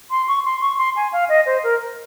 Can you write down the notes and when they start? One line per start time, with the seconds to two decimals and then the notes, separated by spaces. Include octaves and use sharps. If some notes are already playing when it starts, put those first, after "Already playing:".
0.11 C6
0.28 C#6
0.45 C6
0.61 C#6
0.78 C6
0.96 G#5
1.13 F5
1.29 D#5
1.46 C5
1.64 A#4